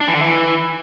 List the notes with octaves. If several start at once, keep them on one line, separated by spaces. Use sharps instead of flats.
D4
E3
D3
E3